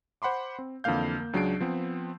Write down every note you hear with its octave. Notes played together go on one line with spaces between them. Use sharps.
C5 F#5 B5 C6 D6
C4
F2 D3 E3 A#3 F5 G6
A#3
C#2 F#3 D4 G#4 C7 D7
F3 B3 C4